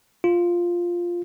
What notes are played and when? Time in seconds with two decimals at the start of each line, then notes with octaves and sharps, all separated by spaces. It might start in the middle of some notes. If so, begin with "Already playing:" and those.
0.24 F4